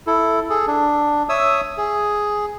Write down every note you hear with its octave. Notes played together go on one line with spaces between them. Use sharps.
E4 A4
G#4 A4
D4
C#5 E5 D#6 E6
G#4